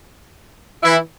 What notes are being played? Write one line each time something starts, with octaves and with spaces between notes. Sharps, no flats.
E3 E4